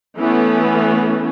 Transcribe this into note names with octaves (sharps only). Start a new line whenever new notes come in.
E3 A3 B3 C#4